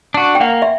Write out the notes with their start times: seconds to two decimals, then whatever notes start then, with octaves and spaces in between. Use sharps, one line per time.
0.14 D4 F#4
0.35 G5
0.40 A#3 F#5
0.62 E5